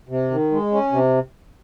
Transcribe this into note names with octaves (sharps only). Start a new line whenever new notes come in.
C3
D#3
G#3
C#4
C3